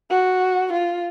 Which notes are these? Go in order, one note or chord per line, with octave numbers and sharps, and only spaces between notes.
F#4
F4